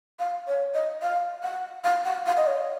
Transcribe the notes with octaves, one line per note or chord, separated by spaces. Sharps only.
F5
C#5
D#5
F5
F#5
F5
F#5
F5
D#5
C#5